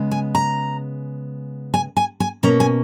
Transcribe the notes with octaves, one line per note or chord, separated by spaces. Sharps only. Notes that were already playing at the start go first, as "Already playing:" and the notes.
Already playing: C#3 G#3 B3
G#5
A#5
G#5
G#5
G#5
B2 A#3 C#4 A#5
G#5